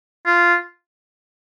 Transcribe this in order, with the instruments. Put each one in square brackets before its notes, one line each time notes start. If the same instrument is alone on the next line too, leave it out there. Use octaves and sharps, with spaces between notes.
[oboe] F4